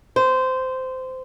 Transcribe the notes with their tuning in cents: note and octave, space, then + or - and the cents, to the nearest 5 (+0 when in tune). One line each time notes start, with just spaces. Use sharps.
C5 -20